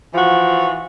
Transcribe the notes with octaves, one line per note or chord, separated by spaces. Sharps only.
E3 F3 F#4